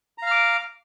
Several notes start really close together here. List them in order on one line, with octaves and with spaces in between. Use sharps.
A#5 F5 F6 D6